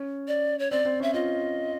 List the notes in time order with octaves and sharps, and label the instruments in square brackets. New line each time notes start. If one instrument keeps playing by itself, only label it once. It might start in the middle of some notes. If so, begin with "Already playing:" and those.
Already playing: [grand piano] C#4
[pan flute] D5
C#5
[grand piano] C4 [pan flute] D5
[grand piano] C4
[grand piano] C#4 [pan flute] E5
[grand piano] F4 [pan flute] D#5